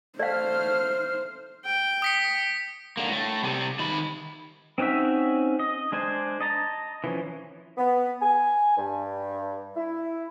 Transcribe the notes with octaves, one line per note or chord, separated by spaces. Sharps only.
A3 C5 D5 F5 F6
G5
D#6 B6 C#7
D3 A#3
A2 A3
C3 G3
D#3 B5
C4 C#4 D#4 F#4 E5
D#5
G#3 D4 C5 G#5
D#5 A5 A#5
E3 F3 C#4
B3
G#5
G2
E4